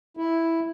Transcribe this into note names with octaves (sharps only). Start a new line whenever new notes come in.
E4